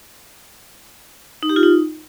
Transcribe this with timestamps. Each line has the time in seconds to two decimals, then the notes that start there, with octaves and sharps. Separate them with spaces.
1.43 D#4
1.49 G4
1.56 F4
1.63 D#4